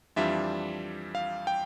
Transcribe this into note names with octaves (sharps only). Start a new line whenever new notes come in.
F2 E3 G3 D4 F4 E5
F5
G5